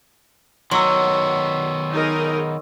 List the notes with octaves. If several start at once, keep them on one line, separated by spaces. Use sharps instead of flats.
D#3 F#3 B3 C6 C#6 E6
D#4 G#4 A#4